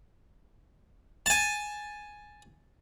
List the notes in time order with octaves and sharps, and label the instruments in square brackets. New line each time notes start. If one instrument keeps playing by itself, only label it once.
[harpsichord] G#5 A5